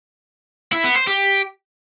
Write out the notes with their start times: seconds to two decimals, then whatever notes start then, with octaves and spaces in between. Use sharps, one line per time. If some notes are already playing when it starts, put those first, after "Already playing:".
0.72 E4
0.84 B3
0.96 C5
1.07 G4